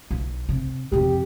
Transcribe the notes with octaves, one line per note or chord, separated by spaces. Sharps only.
B1
C3
F2 C3 G4